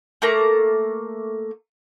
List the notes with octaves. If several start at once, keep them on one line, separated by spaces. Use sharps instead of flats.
A3 A#3 A#5